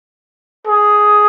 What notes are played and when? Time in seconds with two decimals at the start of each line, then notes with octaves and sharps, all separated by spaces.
0.67 G#4